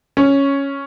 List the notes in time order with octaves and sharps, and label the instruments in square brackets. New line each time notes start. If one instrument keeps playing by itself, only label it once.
[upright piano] C#4